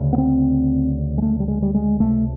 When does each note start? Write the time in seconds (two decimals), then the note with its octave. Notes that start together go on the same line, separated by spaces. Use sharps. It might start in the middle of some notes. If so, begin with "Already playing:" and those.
Already playing: D2 C#3
0.13 B3
0.18 C4
1.18 G#3
1.22 A3
1.40 G3
1.48 G#3
1.62 G3
1.74 G#3
2.00 C#2 C3 A3